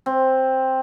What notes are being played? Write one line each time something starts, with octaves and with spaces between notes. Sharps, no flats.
C4